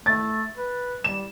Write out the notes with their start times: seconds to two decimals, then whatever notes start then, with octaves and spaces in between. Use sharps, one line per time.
0.06 A3 A6
0.57 B4
1.04 G3 E7